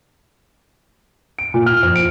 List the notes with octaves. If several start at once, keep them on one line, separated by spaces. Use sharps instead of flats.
D7
A#2
F6
F2
D7